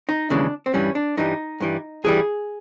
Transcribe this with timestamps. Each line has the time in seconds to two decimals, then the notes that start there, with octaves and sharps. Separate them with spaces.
0.09 D#4
0.30 D#2 C#3 E3 G#3 D4
0.66 C4
0.74 G2 E3 G3 C#4
0.95 D4
1.17 G2 E3 G3 D#4
1.60 G2 E3 G3
2.04 G2 E3 G3 G#4